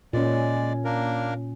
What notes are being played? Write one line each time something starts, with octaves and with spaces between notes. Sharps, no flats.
A#2 G#3 C#4 D5
A#3 D4 A#4